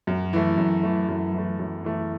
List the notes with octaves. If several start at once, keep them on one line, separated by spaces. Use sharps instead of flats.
F#2
E3 A3
F#2
E3 A3
F#2
E3 A3
F#2
E3 A3